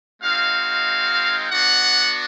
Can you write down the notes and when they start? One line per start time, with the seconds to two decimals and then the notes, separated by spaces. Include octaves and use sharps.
0.22 G#3 C4 D#4 F#4 F5
1.50 B3 D4 F#4 F#5